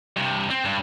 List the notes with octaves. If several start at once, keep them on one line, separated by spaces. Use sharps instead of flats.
G2 C3
C4
G2